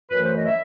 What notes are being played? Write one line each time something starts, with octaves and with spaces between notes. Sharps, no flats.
F#2 E3 A3 B4
C5
D#5
E5